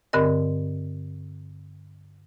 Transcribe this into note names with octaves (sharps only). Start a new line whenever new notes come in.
G2 D3 C4 A#4 D#5